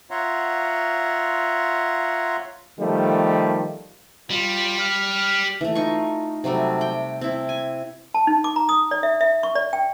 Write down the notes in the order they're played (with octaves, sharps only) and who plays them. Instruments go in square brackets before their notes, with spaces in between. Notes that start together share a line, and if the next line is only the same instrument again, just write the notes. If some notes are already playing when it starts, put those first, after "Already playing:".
[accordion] F4 C#5 E5 F#5 A#5 C6
[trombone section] D#3 F3 G3 A3
[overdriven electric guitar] G3 [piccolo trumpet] F4
[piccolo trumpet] F6
[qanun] E3 A3
D#4 F4 C#6
C3 F#3 G3 A3
G5
C4 E4
G#5
[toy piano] A5
D#4
D6
A#5
D#6
D5
E5
E5
C#6
D5
G5